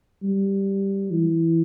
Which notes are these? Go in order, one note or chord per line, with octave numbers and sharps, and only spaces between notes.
G3
E3